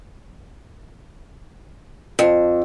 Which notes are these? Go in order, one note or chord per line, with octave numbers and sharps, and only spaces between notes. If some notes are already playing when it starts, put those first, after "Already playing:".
F2